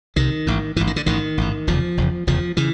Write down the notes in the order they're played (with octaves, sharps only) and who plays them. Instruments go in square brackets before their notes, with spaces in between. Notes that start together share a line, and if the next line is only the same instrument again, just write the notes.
[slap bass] C2 C3 D#3
A1 G#2
A1 G#2 E3
D#3
D3
A1 G#2 D#3
A1 G#2
F1 E2 C#3 F3
F1 E2 C#3
F1 E2 C#3 F3
C#3 E3